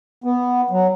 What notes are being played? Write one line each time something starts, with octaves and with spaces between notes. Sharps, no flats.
B3
F#3